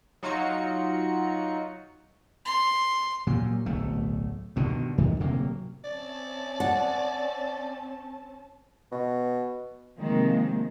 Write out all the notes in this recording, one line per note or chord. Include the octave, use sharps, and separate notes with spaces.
F#3 D#4 F4 F#4 C#7
C6
A#2 F#3 G3
D1 B1 A3
G2 B2 D3 D#3
F2 D#3 G3
D1 C3 F#3 A#3
C4 C#4 D5 A5
F#5
B2
C3 D#3 F3 F#3 G#3 A#3